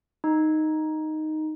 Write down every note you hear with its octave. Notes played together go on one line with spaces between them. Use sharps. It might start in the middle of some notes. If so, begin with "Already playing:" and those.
D#4